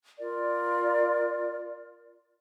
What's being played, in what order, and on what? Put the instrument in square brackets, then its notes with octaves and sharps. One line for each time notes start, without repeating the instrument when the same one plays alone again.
[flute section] F4 A#4 D5